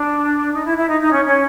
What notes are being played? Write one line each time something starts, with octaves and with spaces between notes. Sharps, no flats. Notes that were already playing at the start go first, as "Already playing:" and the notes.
Already playing: D4
D#4
E4
E4
D#4
D#4
C#4
C#4